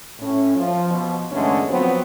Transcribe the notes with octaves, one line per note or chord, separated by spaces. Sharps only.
A2 C#4
F3
B2 F3
E2 G2 D3 G#3 A3 C#4
F3 F#3 B3 C4